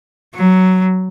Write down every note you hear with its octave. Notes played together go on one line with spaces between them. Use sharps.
F#3